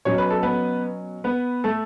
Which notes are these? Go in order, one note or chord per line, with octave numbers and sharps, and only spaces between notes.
B2 F#3 C#4 C#5
B4
A4
B3 B4
B3 B4
A3 A4